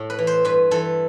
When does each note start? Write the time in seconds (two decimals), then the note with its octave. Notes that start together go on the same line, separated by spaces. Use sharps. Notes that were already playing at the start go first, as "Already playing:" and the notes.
Already playing: A2 A4
0.10 B4
0.19 E3
0.27 C5
0.45 G2 B4
0.71 E3 A4